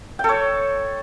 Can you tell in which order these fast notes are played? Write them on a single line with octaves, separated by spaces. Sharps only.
G5 A4 C#5